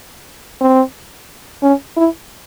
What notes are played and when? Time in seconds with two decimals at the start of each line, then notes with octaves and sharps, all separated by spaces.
0.61 C4
1.62 C#4
1.97 E4